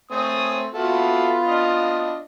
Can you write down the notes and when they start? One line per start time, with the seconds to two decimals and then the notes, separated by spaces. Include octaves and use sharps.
0.11 A3 C4 C#5 G#5 D#6
0.74 B3 F4 F#4 A4 E5
1.46 D4 D#5